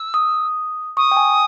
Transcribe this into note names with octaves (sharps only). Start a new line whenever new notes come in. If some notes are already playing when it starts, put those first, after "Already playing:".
Already playing: E6
D#6
C#6 D#6
G5
G#5